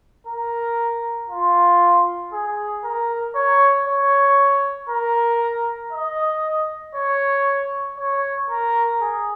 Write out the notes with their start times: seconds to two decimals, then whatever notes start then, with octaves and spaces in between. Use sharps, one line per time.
0.27 A#4
1.30 F4
2.33 G#4
2.84 A#4
3.35 C#5
3.87 C#5
4.90 A#4
5.93 D#5
6.95 C#5
7.98 C#5
8.50 A#4
9.01 G#4